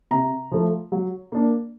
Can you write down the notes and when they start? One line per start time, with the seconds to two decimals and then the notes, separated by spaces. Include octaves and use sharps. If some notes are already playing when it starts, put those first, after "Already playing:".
0.11 C3 A#5
0.51 F3 A3
0.92 F#3
1.32 A#3 D4